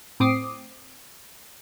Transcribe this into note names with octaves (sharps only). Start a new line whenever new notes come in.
A2 C4 D6 D#6 C7